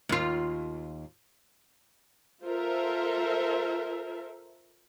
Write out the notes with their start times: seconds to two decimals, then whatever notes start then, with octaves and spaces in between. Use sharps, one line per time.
0.09 D#2 F4
2.43 F4 A4 A#4 C5 E5